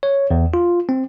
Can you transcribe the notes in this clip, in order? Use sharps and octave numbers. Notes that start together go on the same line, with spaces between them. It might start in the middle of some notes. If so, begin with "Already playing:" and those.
C#5
E2
F4
C4